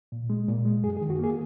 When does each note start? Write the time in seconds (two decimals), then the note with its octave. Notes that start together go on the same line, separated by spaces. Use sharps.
0.12 A#2
0.30 G#3
0.48 A#2
0.65 G#3
0.83 F#2 G#4
0.97 G#4
1.01 D#3
1.10 F#4
1.19 A#3 G#4